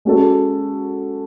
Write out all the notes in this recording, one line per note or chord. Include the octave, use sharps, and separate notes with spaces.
G#3 C#4 F#4 A4